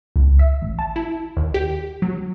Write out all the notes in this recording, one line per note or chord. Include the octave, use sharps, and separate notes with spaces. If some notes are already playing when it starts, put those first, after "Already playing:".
C#2
E5
A1
A5
E4
D#2
G4
F#3